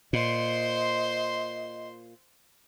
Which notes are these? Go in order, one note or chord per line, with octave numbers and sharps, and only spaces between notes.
A#2 C5 D#5 C6